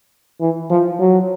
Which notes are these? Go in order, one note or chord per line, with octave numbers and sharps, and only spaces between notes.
E3
F3
F#3